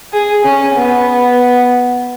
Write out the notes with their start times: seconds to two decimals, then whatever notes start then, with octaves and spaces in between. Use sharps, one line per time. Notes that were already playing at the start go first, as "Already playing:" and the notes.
0.13 G#4
0.45 C#4
0.75 B3